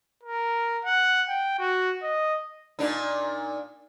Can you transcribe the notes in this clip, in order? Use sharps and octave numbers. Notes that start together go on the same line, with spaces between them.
A#4
F#5
G5
F#4
D#5
A#2 D4 D#4